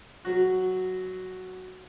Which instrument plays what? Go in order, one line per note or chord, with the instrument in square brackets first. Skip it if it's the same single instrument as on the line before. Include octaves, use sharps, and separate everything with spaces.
[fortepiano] F#3 F#4